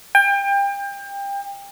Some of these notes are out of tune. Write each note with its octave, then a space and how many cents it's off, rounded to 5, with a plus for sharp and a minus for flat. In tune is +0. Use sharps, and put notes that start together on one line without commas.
G5 +30